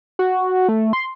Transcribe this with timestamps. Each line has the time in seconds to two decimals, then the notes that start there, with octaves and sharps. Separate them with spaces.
0.19 F#4
0.69 A3
0.93 C6